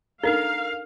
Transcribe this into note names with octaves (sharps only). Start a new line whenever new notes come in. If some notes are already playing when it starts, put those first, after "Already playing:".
D4 D#4 A4 A#4 F5